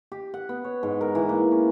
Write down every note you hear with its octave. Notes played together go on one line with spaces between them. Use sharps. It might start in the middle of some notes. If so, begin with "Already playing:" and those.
G4
F#5
B3
C#5
G#2
A#4
E3
A#3
C#4